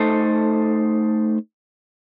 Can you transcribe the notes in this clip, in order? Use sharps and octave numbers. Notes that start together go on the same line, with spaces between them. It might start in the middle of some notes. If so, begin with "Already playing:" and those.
Already playing: A3 D#4 A4 C5